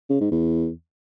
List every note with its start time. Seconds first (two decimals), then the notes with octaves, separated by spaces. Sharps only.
0.10 C#3
0.21 G#2
0.31 E2